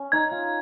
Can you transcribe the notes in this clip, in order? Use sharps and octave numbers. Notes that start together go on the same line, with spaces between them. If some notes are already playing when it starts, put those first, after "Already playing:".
Already playing: C#4
D#4 G#6
F4